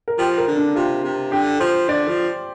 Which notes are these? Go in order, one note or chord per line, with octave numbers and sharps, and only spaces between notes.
A#4
F3 G4
A#4
D3
D4
C3 F4
C3
D3 G4
F3 C5
D3 D5
F3